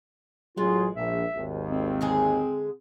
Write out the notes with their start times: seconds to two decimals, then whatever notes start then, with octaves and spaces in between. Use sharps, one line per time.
0.57 A1 F#3 G#3 F4 G#4
0.96 A#1 E5
1.36 G#1 D#2
1.72 C4
2.01 D3 G#3 G#4